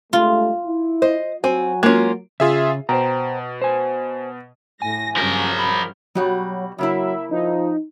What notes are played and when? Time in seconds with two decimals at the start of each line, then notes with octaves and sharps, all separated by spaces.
0.13 G2 G#3 A3 F4
0.66 E4
1.02 C5 D#5
1.44 F#3 C4 F#4 G#5
1.83 G#3 A#3 C#4 F4
2.40 C#3 F4 G#4 E5
2.89 B2 C5 G5 A#5
3.62 C5 G#5
4.82 A2 G#5 A#6
5.16 G2 C#3 F3 F#3 A#4
5.59 B5
6.15 B2 F#3 G3 F#4
6.78 C#3 F#3 A#3 E4 E5
7.31 F3 D#4